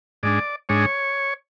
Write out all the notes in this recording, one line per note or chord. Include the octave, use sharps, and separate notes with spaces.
G#2 G#3 D4 D5
G#2 G#3 D4 C#5